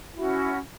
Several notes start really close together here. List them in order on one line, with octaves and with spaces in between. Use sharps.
E4 F#4 C#4